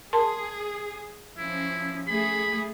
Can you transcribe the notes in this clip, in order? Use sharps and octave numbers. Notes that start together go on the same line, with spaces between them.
G#4 A#4 A5 C6
F3 C#4 E4
A3 G#4 B5